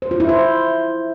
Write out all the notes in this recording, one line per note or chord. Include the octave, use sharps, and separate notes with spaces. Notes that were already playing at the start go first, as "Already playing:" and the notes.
C5
F4
E4
C5